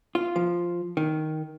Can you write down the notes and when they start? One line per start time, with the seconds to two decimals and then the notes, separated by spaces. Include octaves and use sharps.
0.15 F4
0.36 F3
0.97 D#3